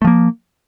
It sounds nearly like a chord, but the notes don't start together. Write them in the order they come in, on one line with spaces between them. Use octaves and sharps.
A3 F3 A#3